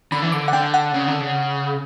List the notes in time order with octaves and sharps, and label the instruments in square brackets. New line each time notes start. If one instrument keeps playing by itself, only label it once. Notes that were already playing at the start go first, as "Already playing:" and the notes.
[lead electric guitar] D3 [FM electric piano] B5
[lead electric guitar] E3
[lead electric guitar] D3 [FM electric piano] D6
[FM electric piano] F#5
[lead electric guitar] D3 [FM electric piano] G5
[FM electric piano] F#5
[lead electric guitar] C#3
D3
C#3